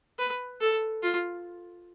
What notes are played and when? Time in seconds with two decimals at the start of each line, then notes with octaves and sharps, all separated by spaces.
0.19 B4
0.61 A4
1.03 F4